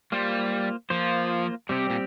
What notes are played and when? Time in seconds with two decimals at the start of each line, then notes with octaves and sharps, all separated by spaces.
0.12 G3 A#3 F4 C5
0.90 F3 A#3 F4 C5
1.69 C3 G3 C4 G4
1.90 A#2